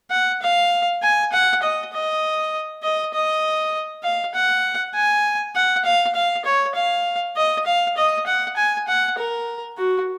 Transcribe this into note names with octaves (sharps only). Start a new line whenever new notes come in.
F#5
F5
G#5
F#5
D#5
D#5
D#5
D#5
F5
F#5
G#5
F#5
F5
F5
C#5
F5
D#5
F5
D#5
F#5
G#5
F#5
A#4
F#4